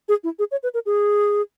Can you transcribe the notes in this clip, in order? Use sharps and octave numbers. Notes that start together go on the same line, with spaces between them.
G#4
E4
G#4
C#5
B4
A#4
G#4